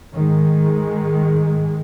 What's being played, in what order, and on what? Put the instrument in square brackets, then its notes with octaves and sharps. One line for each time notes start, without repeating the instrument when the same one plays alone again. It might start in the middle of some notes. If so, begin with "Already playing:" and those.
[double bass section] G#2 D#3 G#3